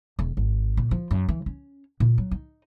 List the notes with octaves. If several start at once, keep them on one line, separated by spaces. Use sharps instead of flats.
E1
G#1
A#2
F3
F#2
E3
C#4
A#2
F#3
D#4